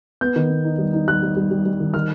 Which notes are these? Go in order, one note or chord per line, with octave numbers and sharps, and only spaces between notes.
B3 G6
D#3
B3
D#4
G3
D#4
G3 F#6
G3
G3
G3
G3
D#3
D#3 F6